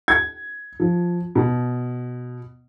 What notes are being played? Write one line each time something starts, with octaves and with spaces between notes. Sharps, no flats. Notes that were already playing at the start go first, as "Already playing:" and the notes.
G#6
F3
B2